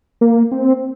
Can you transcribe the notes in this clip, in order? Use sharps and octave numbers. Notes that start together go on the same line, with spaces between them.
A#3
C4